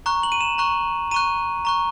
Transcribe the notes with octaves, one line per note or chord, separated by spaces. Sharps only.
A#5 C#6 F#6
F#7
D#7
E7
A#5 C#6 F#6
A#5 C#6 F#6 D#7
A#5 C#6 F#6